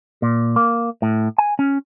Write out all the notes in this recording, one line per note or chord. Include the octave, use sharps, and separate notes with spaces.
A#2
A#3
A2
G#5
C#4